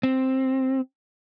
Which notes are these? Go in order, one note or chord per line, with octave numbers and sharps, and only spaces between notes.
C4